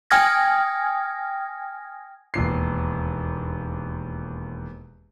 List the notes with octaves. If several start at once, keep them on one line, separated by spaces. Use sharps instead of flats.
G5 G#5 D#6 F6 G#6 A#6
E1 D#2 C7